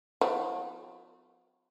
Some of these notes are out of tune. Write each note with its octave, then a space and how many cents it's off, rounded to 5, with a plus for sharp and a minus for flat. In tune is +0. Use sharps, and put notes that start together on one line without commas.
F#3 -45 B3 +45 E4 +0